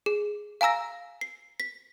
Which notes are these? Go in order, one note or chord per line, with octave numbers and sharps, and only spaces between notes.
G#4
F5 G#5 A#5 E6 A#6
C7
B6